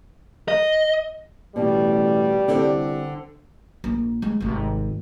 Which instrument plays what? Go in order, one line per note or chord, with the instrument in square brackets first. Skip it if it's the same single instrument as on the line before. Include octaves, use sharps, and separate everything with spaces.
[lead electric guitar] D#5
[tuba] A1 [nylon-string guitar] B2 [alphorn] G3
[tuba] C2 [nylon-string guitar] D3 C4
[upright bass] A#1
G#3
G#1 C3